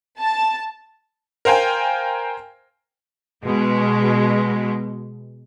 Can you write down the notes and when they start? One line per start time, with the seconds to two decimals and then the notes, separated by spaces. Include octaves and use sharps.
0.20 A5
1.45 A#4 C5 F5 G5 G#5
3.45 B2 G#3